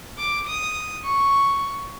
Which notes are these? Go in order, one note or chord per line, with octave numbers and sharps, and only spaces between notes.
D6
D#6
C#6